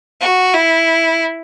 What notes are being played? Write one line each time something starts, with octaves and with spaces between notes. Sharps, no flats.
F#4
E4